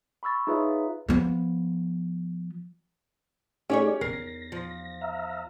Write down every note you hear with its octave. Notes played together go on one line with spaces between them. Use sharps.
B5 C#6 E6 A6
D#4 F4 G#4 B4 C#5 E5
F3 B3
A3 C#4 D#4 G4 G#4 C#5 D5
E2 D#4 A#4 A#6 C7
F3
E5 F5 A#5